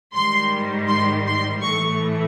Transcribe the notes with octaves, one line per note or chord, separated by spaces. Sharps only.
G#2 D#3 G3 C6
C6
C6
A2 E3 A3 C#6